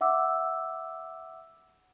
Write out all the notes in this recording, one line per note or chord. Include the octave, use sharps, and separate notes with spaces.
E5 F#5 D6 E6